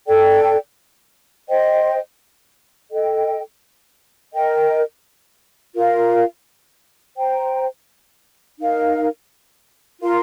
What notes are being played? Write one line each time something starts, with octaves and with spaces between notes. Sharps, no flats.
A4 D5 G5
C5 D#5 G5
A4 D#5 G5
A#4 D#5 G5
F4 A#4 F5
C5 G5 A#5
D#4 A#4 F5
F4 A#4 F5 C6